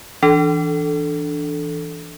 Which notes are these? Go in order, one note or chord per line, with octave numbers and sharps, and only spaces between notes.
E3 D4 A4